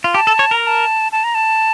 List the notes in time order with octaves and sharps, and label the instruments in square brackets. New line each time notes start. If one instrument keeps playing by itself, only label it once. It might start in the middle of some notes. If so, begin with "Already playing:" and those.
[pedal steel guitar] F4
[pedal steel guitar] G4 [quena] A5
[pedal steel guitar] A4
C#5
[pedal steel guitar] A#4 [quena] A#5
[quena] A#5
A5
A5
A#5
A5